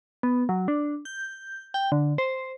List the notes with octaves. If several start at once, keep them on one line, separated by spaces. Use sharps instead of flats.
B3
F#3
D4
G6
G5
D3
C5